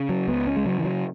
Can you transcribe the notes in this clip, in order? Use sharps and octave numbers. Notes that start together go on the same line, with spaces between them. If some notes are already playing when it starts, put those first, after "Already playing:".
Already playing: C#3
F#3
C#2 B3
C#4
G#3
C#3 F#3
E3
F#3